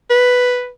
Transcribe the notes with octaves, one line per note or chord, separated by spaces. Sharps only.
B4